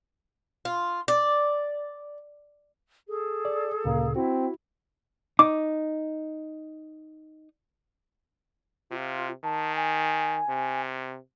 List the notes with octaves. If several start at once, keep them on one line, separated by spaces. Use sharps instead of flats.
F4
D5
G#4 A4
D5
D2 A#2 C#3 A#3
C4 E4 F#4
D#4 D6
C3 F4
D#3 A5
G#5
C3